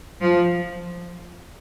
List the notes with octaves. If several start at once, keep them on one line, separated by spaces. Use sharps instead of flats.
F3